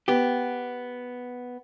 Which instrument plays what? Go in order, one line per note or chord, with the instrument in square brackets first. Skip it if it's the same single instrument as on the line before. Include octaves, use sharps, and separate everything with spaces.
[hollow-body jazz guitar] B3 G4